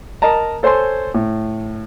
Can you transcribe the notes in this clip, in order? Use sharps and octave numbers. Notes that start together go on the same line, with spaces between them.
A#4 D#5 A5 A#5
A4 C5 C#5 G#5 C6
A2